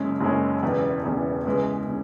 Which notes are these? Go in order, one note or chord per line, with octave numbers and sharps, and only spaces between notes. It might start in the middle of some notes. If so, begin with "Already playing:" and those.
Already playing: F#1 F#2 C#3 G#3 C#4
F#1 F#2 C#3 G#3 C#4
E1 E2 C#3 E3
E1 E2 C#3 E3
C#2 C#3 E3 G#3
C#3